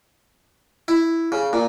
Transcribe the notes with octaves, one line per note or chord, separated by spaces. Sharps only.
E4
C#3
A#2